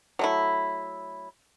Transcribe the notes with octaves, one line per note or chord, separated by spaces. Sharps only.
F#3 A3 E4